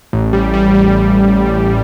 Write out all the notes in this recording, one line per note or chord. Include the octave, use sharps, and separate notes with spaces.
A1
G3
G3
G3